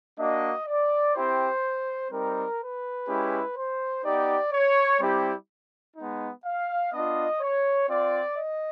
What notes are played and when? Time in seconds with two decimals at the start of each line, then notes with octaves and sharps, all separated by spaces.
0.19 A#3 D4 F#4 D#5
0.67 D5
1.15 C4 E4 G4 C5
2.11 G3 C4 D#4 A#4
2.60 B4
3.08 G#3 C#4 E4 G4
3.56 C5
4.04 B3 D#4 G4 D5
4.53 C#5
5.00 G3 C4 E4 G4
5.96 G#3 B3 D#4
6.45 F5
6.92 B3 D4 F4 D#5
7.41 C#5
7.89 C4 F4 D5
8.37 D#5